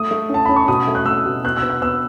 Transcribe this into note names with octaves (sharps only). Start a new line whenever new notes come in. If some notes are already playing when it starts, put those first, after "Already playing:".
Already playing: A3 D#6
A3
C#4 A5
C#4 B5
C#6
B2 D#6
A3
F#6
A3 E6
B2
B3 F#6
E6
B3
F#6
B3 E6